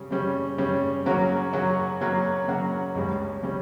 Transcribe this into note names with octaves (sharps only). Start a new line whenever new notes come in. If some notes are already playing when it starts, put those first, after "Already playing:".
Already playing: C#3 G3 C#4
C#3 G3 C#4
C#3 G3 C#4
C#3 F#3 A#3 C#4 F#4
C#3 F#3 A#3 C#4 F#4
C#3 F#3 A#3 C#4 F#4
C#3 F#3 A#3 C#4 F#4
C#2 C#3 G3 C#4
C#3 G3 C#4